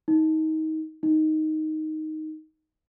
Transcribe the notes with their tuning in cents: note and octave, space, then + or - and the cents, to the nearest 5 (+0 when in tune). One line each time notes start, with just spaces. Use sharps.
D#4 +25
D#4 +5